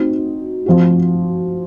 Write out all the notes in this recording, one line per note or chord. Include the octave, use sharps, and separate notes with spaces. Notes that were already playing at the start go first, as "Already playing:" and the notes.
Already playing: C4 D#4 F#4
F3 C4 F#4